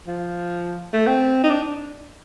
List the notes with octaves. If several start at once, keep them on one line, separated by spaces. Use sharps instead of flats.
F3
A3
C4
D#4
D4